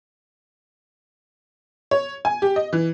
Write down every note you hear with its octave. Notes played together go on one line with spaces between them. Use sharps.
C#5
G#5
G4
D#5
E3